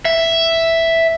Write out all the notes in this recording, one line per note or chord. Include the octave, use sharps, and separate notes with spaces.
E5